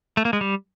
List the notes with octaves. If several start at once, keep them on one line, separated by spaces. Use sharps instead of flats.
A3
A#3
G#3
G3